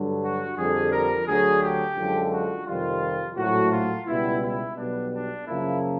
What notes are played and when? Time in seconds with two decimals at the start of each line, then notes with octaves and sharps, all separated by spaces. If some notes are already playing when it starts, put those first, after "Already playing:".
Already playing: G2 D3 F#3
0.23 F#4
0.57 F2 D3 G3 G#4
0.92 A#4
1.27 D2 D3 F#3 G#4
1.62 G4
1.97 F#2 D3 F3 G#3
2.32 F#4
2.67 F2 C3 D#3 G3 F4
3.37 A#1 A2 F#3 A3 F#4
3.72 F4
4.07 C#2 B2 G3 B3 E4
4.42 E4
4.77 B1 B2 G3 B3 D4
5.12 D4
5.47 F#2 C#3 F3 A#3 E4